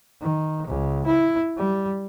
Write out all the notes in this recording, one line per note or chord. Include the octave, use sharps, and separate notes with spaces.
D#3
C#2
E4
G3